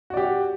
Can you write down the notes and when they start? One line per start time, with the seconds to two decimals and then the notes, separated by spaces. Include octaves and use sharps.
0.10 F#4
0.14 D5
0.17 G4